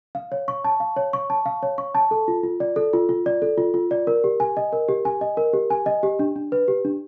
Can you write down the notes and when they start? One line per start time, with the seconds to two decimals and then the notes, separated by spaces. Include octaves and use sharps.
0.15 F5
0.32 C#5
0.48 C#6
0.64 A5
0.80 F5
0.96 C#5
1.13 C#6
1.30 A5
1.46 F5
1.63 C#5
1.78 C#6
1.95 A5
2.11 A4
2.28 F4
2.43 F4
2.60 D5
2.76 A4
2.93 F4
3.09 F4
3.26 D5
3.42 A4
3.58 F4
3.74 F4
3.91 D5
4.07 A#4
4.24 G4
4.40 G#5
4.57 D#5
4.73 A#4
4.88 G4
5.05 G#5
5.21 D#5
5.37 A#4
5.53 G4
5.70 G#5
5.86 D#5
6.03 G4
6.19 D4
6.36 D4
6.52 B4
6.68 G4
6.85 D4